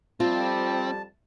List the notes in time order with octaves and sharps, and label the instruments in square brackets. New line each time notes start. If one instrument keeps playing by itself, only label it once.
[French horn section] F2 G3 [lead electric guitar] C4 [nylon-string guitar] F4 [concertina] A5